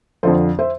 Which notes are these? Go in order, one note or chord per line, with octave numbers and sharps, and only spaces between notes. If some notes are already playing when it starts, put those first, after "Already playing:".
F2 D3 F3 A4 C5
C5 E5